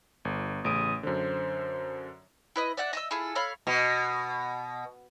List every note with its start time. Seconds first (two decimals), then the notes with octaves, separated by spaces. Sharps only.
0.25 G1
0.65 A1 C#3 D#6 D7
1.03 F#2 D3 C5
2.56 E4 B4 D#5
2.77 D5 E5 F#5 F#6
2.93 D#5 E5 E6
3.11 E4 F4 G#4 A4
3.35 A4 C#5 F5 B5
3.67 B2